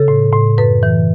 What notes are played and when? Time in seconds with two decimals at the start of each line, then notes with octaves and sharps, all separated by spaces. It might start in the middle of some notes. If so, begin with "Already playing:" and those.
Already playing: C#3 A4
0.08 A2
0.33 A2
0.58 F#2 B4
0.83 E3